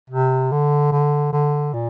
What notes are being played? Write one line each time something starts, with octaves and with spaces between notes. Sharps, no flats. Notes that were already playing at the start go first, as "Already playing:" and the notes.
C3
D3
D3
D3
A#2